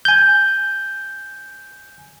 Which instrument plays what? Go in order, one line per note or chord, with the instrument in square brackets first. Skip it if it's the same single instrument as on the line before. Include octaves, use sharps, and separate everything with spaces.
[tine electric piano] G#5 G6